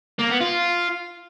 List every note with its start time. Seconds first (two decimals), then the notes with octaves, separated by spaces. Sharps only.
0.19 A#3
0.30 B3
0.41 F4